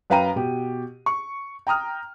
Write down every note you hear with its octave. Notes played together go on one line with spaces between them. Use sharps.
F#2 B4 F5 G5 A#5 D#7
B2 G4
C#6
G5 A#5 D#6 F6